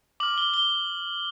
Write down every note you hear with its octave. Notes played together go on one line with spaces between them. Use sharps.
D6 F6 F#7
G7
G7